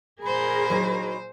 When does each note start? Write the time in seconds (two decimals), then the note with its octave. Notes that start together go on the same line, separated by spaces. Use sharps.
0.23 A#2 G#4 A#4 C5 B5
0.70 F#3 D#4